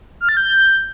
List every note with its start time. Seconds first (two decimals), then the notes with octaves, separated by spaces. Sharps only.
0.21 F6
0.29 A6
0.37 G6